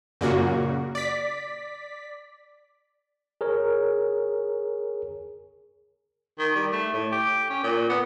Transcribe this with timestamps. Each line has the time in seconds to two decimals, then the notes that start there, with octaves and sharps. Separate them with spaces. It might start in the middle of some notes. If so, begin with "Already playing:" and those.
0.21 F#2 A#2 C#3 A#3 F#4
0.95 D5 B6
3.41 G#4 A#4 C#5
6.39 D#3
6.56 G3
6.72 A3
6.93 A2
7.12 G4
7.50 C#4
7.63 A#2
7.89 B3